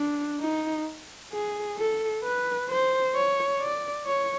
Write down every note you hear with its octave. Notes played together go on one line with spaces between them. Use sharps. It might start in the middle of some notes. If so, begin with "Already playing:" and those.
Already playing: D4
D#4
G#4
A4
B4
C5
C#5
D5
C#5